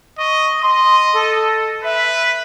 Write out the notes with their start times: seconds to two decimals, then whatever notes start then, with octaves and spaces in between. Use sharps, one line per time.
0.18 D#5 C#6
0.62 D#5 C6
1.13 A4
1.84 B4 E5